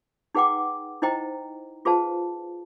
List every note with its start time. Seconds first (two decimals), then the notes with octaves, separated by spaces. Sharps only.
0.35 D#4 G#4 B4 F#5 G5 D6
1.02 D#4 E4 C5 D#5 G5 A#5
1.85 F4 G#4 B4 C5 F5 A5